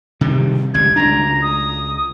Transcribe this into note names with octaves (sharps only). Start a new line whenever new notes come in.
C3 D#3 G3
G#1 C#2 G3 G#6
C#2 D4 A#5
D#6